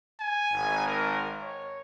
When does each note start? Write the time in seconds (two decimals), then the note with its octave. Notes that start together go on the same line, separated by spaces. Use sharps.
0.20 G#5
0.52 G#1
0.87 A#4
1.42 C#5